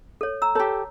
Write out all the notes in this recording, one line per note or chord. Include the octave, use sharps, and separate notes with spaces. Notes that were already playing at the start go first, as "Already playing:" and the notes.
A4 C#5
A#5 E6
G4 A4 C#5